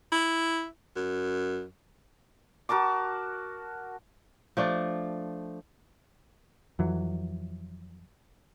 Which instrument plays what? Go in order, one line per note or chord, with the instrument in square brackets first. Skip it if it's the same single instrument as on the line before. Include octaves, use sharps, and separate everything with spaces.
[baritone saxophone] E4
F#2
[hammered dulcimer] F#4 A#4 A5 D6
[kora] F3 A3 D4
[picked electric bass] F2 E3 F#3